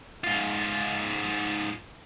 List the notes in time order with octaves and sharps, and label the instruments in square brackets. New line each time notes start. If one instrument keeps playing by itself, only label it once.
[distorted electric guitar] G#2 F4